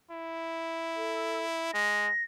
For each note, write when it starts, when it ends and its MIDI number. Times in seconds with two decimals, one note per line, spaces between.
0.11 1.73 64
0.96 1.45 69
1.74 2.09 56
1.74 2.24 94